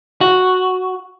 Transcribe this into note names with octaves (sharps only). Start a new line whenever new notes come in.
F#4